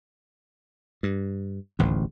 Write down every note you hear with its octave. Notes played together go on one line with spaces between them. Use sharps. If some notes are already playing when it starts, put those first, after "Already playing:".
G2
D1 A1 D#2